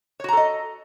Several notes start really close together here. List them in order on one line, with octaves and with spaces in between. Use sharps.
C#5 F#4 A#5 A4 D#5